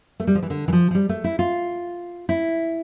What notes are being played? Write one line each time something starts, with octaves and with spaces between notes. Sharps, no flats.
A3
G3
F3
E3
D3
E3
F3
F3
G3
A3
E4
F4
E4